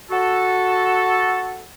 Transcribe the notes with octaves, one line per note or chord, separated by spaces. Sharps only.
F#4 A4